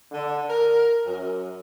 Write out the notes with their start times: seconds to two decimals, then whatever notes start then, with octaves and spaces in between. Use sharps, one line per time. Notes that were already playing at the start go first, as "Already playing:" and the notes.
0.11 D3
0.49 A#4
1.06 F#2